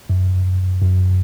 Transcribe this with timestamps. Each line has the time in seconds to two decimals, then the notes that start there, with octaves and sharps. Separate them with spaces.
0.10 F#2
0.82 F#2